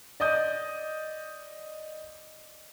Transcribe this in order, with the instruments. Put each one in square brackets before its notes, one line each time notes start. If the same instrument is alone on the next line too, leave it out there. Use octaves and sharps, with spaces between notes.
[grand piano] D5 D#5 D#6 G6